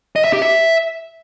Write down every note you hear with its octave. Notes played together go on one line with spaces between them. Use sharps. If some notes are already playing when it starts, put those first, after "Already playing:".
D#5
E5
G4
E5